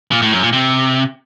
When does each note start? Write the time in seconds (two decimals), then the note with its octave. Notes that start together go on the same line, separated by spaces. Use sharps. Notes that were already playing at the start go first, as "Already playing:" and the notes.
0.12 A#2
0.22 A2
0.32 F#2
0.42 A#2
0.53 C3